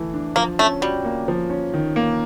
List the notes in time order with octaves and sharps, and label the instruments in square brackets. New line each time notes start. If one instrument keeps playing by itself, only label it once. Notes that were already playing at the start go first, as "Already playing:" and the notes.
Already playing: [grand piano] E3 A3
D4
[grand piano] F3 [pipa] A#3
[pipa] A3 [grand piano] C#4
[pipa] G3 [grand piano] F#4
[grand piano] A#3
F3
C#4
D#3
A#3